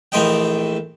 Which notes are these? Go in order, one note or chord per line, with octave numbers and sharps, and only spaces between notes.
A#1 E3 A3 C4 D#5 G5